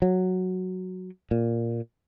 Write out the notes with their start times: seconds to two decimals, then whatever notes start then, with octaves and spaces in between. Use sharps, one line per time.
0.02 F#3
1.31 A#2